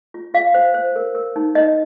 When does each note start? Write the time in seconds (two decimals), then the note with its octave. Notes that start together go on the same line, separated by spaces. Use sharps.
0.14 F4
0.34 F4 F5
0.54 C5
0.74 C5
0.96 A#4
1.15 A#4
1.36 D#4
1.55 D#4 D#5